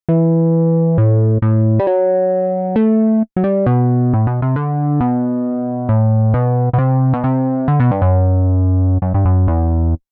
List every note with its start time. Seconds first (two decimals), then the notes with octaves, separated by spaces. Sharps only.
0.09 E3
0.98 A2
1.42 A2
1.79 G3
1.87 F#3
2.76 A3
3.36 F#3
3.44 G3
3.66 B2
4.13 A2
4.27 B2
4.42 C3
4.56 D3
5.01 B2
5.89 A2
6.34 B2
6.73 B2
6.78 C3
7.13 B2
7.24 C3
7.68 D3
7.80 B2
7.91 G2
8.02 F#2
9.02 F#2
9.14 G2
9.25 F#2
9.47 E2